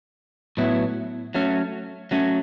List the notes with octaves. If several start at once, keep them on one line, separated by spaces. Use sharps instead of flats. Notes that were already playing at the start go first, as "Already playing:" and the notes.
A2 F#3 B3 E4
F#3 A3 C#4
F#3 A3 C#4